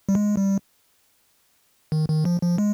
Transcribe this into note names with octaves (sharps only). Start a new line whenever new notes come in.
G3
G#3
G3
D#3
D#3
F3
F3
G#3